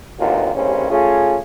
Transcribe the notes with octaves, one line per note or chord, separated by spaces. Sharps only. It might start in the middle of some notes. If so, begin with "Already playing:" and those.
G#1 D#2 B2 D3 F#3 F4
A1 D#2 C#3 G3 C4 C#4
A3 C#4 F4 G#4